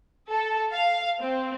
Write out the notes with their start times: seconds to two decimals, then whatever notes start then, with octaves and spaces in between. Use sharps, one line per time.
0.30 A4
0.73 F5
1.21 C4